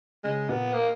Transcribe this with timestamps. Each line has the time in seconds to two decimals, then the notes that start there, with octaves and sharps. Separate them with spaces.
0.24 C#3 G#3
0.49 A#2 B3
0.73 A#3